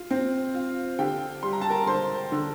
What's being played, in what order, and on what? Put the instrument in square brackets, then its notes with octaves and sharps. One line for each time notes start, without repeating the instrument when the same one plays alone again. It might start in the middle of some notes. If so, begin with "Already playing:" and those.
Already playing: [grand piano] F4
C4
F4
D3 G4 G5
G3 C6
A#5
A5
A#4 A#5
D3 C5 C6
D3